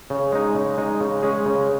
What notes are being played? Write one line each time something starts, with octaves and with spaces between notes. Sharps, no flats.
C#3
G#3 D#4
C#3
G#3 D#4
C#3
G#3 C#4 G#4
C#3